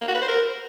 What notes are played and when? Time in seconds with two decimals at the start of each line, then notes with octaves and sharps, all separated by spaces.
0.01 A#3
0.08 F#4
0.15 B4
0.21 C5
0.28 A#4